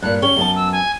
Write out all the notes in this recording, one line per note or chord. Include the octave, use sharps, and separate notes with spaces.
G2 A#2 F#6
C#4 G4 C#5 G7
F#2 B3 A5
E6
G#5